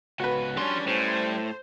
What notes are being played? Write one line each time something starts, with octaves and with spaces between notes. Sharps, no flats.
C#2 B3 F#4 B4
F3 G3 C#4 D4 C6
A2 G3 C5